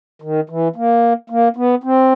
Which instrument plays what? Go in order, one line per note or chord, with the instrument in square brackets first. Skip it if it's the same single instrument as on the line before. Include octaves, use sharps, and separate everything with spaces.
[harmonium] D#3
E3
A#3
A#3
B3
C4